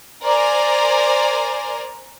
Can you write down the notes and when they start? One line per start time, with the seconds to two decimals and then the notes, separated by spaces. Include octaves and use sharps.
0.23 A#4 C5 D5 G#5 A#5